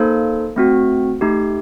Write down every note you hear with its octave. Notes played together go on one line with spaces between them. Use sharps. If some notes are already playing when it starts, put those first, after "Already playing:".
Already playing: A#3 D#4 A4 C5
A3 C4 F#4
A3 D#4 G4